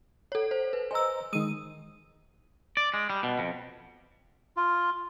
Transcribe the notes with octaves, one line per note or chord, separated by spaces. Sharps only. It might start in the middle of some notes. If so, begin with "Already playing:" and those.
A4 C#5
C5
B4
C5 D#5 G#5 A#5 E6
D#3 G#3 D#6 D#7
D5
G#3
G3
B2
F2
F4